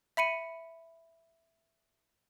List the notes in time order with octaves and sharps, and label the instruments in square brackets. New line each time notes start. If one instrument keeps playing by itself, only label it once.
[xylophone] E5 B5 C#7 D#7